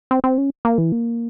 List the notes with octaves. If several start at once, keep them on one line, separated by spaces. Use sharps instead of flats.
C4
C4
C#4
A#3
E3
A#3